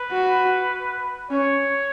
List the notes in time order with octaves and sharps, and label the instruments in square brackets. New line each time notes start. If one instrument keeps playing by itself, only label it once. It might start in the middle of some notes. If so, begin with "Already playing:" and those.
Already playing: [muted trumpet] B4
[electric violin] F#4
[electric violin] C#4 [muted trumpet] C#5